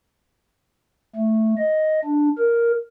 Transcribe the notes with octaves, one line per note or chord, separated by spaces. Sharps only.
A3
D#5
D4
A#4